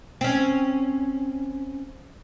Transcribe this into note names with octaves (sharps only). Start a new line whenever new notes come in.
C4 C#4